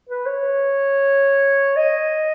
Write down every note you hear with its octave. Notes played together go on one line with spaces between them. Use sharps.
B4
C#5
D#5